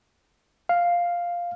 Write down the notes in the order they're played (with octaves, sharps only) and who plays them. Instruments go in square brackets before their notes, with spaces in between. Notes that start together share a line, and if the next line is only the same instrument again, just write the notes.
[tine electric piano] F5